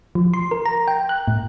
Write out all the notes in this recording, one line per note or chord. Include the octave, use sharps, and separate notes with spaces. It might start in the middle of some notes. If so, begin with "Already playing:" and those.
F3
C6
A#4
A#5
G5
F#6
A2